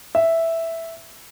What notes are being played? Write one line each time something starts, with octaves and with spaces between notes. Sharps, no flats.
E5